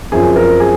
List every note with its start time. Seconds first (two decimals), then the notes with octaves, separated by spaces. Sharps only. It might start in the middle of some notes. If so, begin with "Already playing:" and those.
0.12 F#2 F3 C4 G#4
0.36 A#4
0.60 G#4